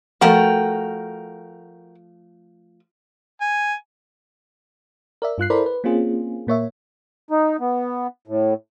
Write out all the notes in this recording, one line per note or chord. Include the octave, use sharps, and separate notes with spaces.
F3 A3 F#4 A#4 G5
G#5
A#4 D5 E5
G2 F4 F#6 C7
E4 A4 A#4 C5 D5 B5
B4
A#3 C4 C#4 F4 G#4
A#2 A#3 C#5 E5
D#4
B3
A2